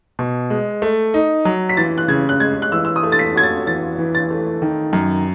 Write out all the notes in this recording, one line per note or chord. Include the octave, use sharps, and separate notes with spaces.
B2
G#3
A3
D#4
F#3
B6
E3 A6
F#6
C#3 G#6
F#6
G#3 G#6
F#6
E3 E6
E6
D#6
A3
A6
B6
F#4 G#6
A6
E3 A6
E3
A6
A3
D#3
F#2